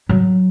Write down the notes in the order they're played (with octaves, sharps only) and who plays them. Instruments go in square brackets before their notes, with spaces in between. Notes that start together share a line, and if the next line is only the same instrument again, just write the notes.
[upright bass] F#3